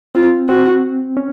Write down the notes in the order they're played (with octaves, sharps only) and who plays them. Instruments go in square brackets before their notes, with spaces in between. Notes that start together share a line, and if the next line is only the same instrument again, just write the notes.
[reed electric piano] C4 [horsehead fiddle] F4
[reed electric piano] C4 [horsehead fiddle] F#4
[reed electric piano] C#4